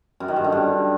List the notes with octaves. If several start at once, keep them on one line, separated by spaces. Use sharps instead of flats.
F#2
D#3
G2
D3
G2